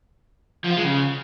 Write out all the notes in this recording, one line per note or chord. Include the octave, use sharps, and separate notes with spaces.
F3
F4
G#3
C#3